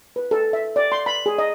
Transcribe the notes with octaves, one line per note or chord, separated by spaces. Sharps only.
B4
A4
E5
D5
C6
B5
G#4
D#5